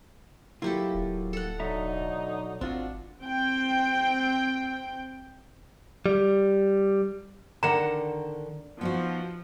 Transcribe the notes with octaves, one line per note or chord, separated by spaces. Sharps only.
F#3 A#3 E4 F4 G4 A4
D1
A4 F#5
B1 D3 F#3 D#4 E5 A#5
G#1 C4 D4 F4 F#4
C4 G5
G3
D3 D#3 D4 A#4 F#5 A#5
F3 B3 D#4 F#4